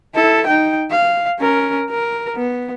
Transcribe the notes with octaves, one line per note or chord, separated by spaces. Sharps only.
E4 A4
D#4 G5
F5
C#4 A#4
A#4
B3